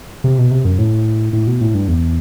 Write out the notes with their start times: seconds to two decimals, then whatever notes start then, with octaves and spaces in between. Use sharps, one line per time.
0.24 C3
0.38 B2
0.51 C3
0.65 F#2
0.79 A2
1.33 A2
1.47 B2
1.61 A2
1.74 G2
1.88 E2